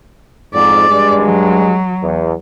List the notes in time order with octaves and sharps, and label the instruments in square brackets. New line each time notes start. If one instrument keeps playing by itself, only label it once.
[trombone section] F2 G#2 [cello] D5
[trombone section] G2 G#3
[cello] F#3
[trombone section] E2